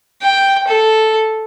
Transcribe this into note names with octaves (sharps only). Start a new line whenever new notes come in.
G5
A4